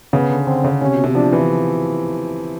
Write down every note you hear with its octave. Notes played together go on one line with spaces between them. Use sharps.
C#3 B3
D3
D3 C4
C#3
C3 C#4
B2
C3
F3 D4
E3